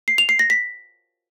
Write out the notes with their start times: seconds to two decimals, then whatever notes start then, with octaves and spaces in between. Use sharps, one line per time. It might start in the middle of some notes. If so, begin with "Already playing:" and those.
0.08 C7
0.18 F7
0.29 C7
0.39 A#6
0.50 B6